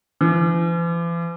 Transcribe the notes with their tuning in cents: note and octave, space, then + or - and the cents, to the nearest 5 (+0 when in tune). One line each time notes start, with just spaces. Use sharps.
E3 +45